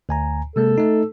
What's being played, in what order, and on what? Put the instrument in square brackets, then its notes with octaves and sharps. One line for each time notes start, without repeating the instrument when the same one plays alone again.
[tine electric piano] D2 G#5 A#5
[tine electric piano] C3 G#3 A#3 [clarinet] A4
[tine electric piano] A3 D#4